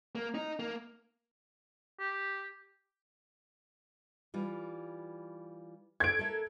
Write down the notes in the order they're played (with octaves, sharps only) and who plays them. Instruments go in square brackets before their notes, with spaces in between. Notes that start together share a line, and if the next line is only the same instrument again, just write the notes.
[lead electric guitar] A#3
D#4
A#3
[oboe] G4
[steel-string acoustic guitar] E3 G3 F4
[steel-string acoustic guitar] A4 [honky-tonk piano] G#6 D7
[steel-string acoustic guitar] A4 A#4 E5